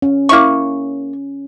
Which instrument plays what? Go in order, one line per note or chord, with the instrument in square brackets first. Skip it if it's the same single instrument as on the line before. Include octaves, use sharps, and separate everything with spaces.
[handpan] C#4
[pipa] A#3 E4 C#6